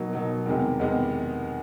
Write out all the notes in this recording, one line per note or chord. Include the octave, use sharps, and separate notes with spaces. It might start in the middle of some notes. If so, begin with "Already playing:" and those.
Already playing: B2 F#3 A#3 D#4
B2 F#3 A#3 D#4
E2 C3 D#3 G#3 B3
E2 C3 D#3 G#3 B3